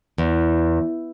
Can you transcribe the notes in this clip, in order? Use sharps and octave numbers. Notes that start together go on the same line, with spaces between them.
E2